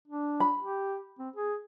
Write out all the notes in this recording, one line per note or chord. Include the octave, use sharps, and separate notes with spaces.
D4
B5
G4
C4
G#4